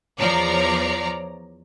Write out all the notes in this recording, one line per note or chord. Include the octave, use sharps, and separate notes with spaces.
E2 F3 C#5 D5 A#5